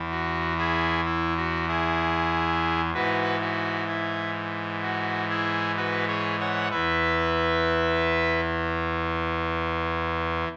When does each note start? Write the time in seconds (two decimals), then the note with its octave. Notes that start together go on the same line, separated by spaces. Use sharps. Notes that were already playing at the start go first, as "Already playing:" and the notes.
Already playing: E2 E3
0.11 F#4
0.58 E4 G#4
1.05 E4
1.37 F#4
1.68 E4 G#4
2.94 G#2 E3 F#4 B4
3.41 F#4
3.88 E4
4.83 F#4
5.29 E4 G#4
5.77 F#4 B4
6.08 G#4 C#5
6.40 C#5 F#5
6.71 E2 E3 B4 E5